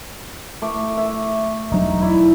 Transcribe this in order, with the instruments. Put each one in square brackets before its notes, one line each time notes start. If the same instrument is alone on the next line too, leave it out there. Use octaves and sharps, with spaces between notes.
[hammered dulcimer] A3 D6
E5
[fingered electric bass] E1 F#3 D4 [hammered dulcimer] D#4
[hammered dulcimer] E4 D5